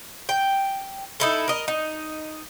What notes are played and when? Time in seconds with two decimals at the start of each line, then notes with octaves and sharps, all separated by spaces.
0.29 G5
1.20 D#4 E4 A4
1.48 A#4 D#5
1.68 D#4